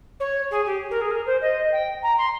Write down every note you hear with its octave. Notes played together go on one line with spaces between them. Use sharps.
C#5
G#4
G4
A#4
G#4
A#4
C5
D#5
G5
A#5
C6